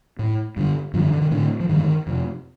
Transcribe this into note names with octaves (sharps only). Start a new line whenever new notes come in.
A2
G2 D3
G2 D3 F3
D#3
D3
D#3
A2 D3
F3
G2 D3 D#3
F2 C3